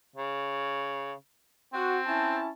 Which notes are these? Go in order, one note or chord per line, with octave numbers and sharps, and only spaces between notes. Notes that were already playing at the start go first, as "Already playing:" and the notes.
C#3
C4 F#4
C#4 E4 A5